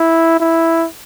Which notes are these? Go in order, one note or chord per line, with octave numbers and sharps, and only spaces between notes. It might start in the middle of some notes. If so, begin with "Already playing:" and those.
Already playing: E4
E4